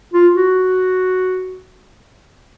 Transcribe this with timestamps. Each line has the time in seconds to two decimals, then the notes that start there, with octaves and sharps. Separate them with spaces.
0.13 F4
0.35 F#4